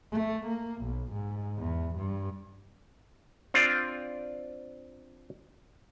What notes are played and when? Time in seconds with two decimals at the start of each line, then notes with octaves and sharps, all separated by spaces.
0.12 A3
0.47 A#3
0.82 B1
1.12 G#2
1.58 E2
1.97 G2
3.54 C4 D4 F4 D5